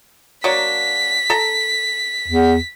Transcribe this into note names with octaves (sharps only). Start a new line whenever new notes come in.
F#3 A#3 D4 B6
A4 A#5
E2